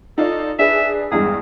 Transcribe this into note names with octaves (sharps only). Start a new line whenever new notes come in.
D#4 F4 A4 D5
D4 G#4 B4 E5
E2 G2 G#3 G#4